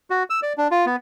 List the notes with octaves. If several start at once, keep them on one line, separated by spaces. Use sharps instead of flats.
F#4
E6
D5
D4
F4
B3